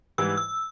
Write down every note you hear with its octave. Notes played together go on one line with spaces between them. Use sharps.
G#2 E3 G3 E6
E6